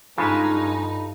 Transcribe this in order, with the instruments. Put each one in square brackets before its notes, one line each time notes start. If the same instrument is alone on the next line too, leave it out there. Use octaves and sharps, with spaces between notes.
[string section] G2 D#4 [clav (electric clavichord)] C#3 G#3 [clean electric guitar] F4 A4 B4